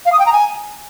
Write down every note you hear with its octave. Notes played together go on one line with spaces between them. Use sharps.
F5
D#6
G5
A#5
G#5